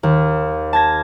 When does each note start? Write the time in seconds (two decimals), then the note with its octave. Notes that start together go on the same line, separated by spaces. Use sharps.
0.03 D#2
0.73 A5 G#6 A#6